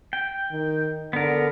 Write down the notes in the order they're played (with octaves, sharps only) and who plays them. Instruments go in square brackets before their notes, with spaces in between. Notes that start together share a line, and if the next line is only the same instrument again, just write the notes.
[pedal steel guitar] G5
[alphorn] D#3
[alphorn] D3 [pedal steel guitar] B3 A#4